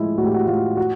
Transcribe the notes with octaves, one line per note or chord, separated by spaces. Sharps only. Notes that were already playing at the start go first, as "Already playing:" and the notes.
Already playing: A2 F3 G#3 E4
A2 F#4
G4
F#4
A2 F4
F#4